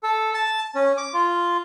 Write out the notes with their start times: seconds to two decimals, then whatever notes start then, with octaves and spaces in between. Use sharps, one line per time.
0.03 A4
0.34 A5
0.75 C#4
0.97 D6
1.13 F4